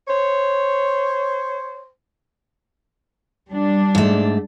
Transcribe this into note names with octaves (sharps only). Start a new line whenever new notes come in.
C5 C#5
G3 D4
G#2 A3